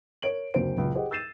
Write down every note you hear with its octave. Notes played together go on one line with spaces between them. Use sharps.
A#4 C#5 D7 F#7
F#1 D2 A#3 C4 C5 D7
F#1 C#2 A#2
G4 G#4 C5 D#5 F#5
E6 G6 A6 C7 D#7 E7